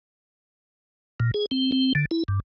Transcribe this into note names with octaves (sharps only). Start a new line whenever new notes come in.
A#2
G#4
C4
C4
D3
E4
G2